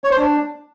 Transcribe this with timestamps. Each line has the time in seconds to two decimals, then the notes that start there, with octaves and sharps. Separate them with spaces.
0.04 C#5
0.11 C5
0.17 D4